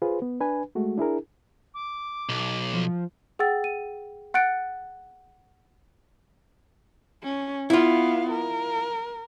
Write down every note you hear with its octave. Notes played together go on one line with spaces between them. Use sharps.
F4 G#4 B4 C5
B3
D4 B4 G#5
G#3 A3 F#4
D4 E4 G#4 A#4
D6
B1
F3
G#4 F#5 G5 E6 A6
D#7
F#5 F#6 A6 C#7 D7
C#4
B3 E4 F4 F5
A#4